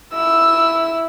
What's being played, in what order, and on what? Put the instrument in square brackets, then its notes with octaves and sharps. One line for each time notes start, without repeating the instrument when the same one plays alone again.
[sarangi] E4 [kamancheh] E6